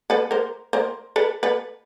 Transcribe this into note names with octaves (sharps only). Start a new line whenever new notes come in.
A4 B4
A#4 C5
A#4 C5
A4 B4
A4 B4